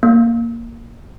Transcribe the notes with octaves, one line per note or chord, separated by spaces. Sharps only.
A#3